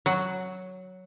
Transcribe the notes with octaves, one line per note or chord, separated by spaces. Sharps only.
F#3 F#4